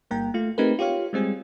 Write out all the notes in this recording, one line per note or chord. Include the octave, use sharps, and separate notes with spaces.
G1 G2 A#3 G5 A#5
A3 F4
A3 C4 D#4 G4 A#4 B4
F4 G4 C#5 F5
G3 G#3 C4 G#4